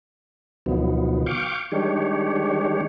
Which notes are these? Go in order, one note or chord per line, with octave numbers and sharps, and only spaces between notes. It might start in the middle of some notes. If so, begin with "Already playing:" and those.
D2 B2 D#3 F3 F#3 B3
F5 G5 C#6 D6
D#3 G3 G#3 D4 G4 C#5